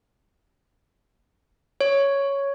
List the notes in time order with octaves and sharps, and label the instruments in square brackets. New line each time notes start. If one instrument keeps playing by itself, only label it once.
[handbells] C#5